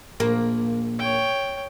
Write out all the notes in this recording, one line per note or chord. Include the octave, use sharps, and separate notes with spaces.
A#1 A#3
C#5 G5